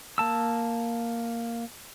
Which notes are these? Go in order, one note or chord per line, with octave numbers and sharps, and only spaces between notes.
A#3 A5 E6